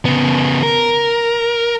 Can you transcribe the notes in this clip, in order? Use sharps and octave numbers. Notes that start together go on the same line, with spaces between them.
C#3 B3
A#4